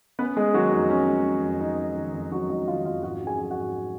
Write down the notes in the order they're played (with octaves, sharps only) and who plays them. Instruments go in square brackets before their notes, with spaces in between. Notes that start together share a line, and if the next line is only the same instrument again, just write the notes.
[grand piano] B3 C#4 B4
G#3 G#4
D#3 F#3 F#4
F2 D#4
C#4
G#3
D#3
F2
C#4 D#4
G#3
D#3
F2
F#3 C#4 F#4
G#3 D#4 D#5
D#3 F4 F5
F2 F4 F5
G#2 F#4 F#5
C#4
G#4 G#5
F#3
F#4 F#5
G#2